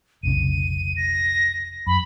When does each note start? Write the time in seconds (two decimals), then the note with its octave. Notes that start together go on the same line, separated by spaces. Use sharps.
0.23 F1 B1 C#3 D#7
0.97 A#6
1.87 F#2 B5